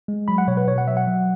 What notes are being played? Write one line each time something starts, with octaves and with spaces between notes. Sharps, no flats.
G#3
F#3 B5
F#5
B2 C#5
B4
B2 C#5
F#5
F#3 E5
F#5
F#3